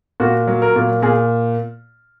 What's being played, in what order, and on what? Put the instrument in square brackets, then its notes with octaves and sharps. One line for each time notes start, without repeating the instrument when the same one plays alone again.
[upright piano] A#2 F#4
F#3
A#4
A#2
A#2 G#4